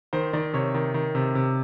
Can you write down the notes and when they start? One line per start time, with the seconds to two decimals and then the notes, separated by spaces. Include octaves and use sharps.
0.13 D#3 C5
0.33 D#3 D5
0.54 C3 C#5
0.74 D#3
0.94 D#3
1.15 C3
1.35 C3